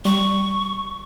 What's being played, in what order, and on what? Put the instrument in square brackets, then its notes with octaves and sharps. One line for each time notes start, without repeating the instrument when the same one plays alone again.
[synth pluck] G3 [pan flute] C#6